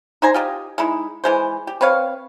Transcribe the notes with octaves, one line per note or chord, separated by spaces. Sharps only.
D#4 C5 G#5 A#5
F4 G4 D#5
G#3 D#4 E4
E3 G#3 C5
G4
C4 B4 C#5 F5